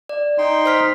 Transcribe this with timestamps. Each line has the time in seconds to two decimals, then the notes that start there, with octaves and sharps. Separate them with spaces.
0.09 D5
0.38 D#4 G5 C6
0.66 C5 F6 B6